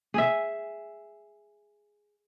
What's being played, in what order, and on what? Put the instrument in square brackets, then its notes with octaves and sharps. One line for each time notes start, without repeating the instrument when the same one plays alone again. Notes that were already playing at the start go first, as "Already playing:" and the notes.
[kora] G#4 E5